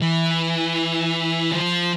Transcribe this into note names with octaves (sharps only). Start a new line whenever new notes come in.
E3
F3